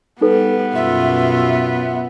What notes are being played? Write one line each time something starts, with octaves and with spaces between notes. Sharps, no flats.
G3 B3 D#4 A4 B4
F#2 B2 F4 E5